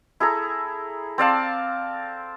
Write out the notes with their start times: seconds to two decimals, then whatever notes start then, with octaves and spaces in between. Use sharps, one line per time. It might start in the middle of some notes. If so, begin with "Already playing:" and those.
0.20 E4 G#4 A4 A#5
1.18 C4 D5 F5 A5